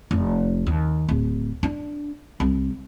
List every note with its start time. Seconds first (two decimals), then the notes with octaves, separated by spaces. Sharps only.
0.11 F1
0.66 D#2
1.09 D1
1.63 D4
2.40 C2